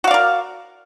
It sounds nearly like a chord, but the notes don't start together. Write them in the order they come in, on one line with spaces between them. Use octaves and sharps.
F#4 F5 D5 A#4